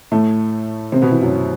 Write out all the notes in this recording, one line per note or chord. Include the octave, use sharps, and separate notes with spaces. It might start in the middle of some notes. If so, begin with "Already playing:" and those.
A2 A3
C3 C4
B2 B3
E3
F#2 F#3